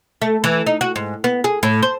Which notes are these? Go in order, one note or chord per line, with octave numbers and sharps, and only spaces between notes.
A3
E3
D#4
F#4
G#2
B3
G#4
A2
C5